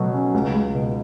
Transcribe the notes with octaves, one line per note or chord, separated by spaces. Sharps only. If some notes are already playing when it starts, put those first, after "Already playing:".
Already playing: B2 F#3 A3 F#4
C#4
C#2
C#2
B2